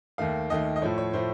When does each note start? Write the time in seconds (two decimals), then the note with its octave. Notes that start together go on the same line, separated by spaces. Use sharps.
0.18 D#2 D#3 A3 F5
0.50 D#2 D#3 A3 D#5
0.76 D#5
0.82 A2 F3 A3 C#5
0.98 C#5
1.13 A2 F3 A3 C5